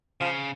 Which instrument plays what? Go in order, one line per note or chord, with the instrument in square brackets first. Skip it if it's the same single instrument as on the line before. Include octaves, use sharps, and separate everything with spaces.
[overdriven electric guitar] C#3 [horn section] F3